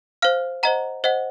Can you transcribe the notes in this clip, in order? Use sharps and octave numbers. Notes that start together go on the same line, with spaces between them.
C5 F5 F6
C5 D#5 F#5 A#5
C5 D#5 F#5